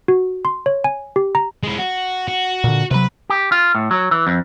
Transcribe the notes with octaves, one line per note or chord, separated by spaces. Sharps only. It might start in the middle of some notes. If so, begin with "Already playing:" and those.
F#4
C6
C#5
G#5
G4
A#5
G#3 E4
F#4
F#4
A#2 D3
C3 F#3 B4 B5
G4
F4
A2
F#3
E3
F2